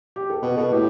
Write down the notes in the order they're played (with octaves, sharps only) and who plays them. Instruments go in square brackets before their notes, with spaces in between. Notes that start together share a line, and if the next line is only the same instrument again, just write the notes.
[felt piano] G4
A4
[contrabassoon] B2 [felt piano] B4
[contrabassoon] B2 [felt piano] A4
[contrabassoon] A2 [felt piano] G4